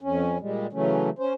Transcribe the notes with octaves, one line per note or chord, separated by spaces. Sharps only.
F2 C#4
A#2 G3 G#3
C#3 E3 F#3 A3 C#4
C#4 C5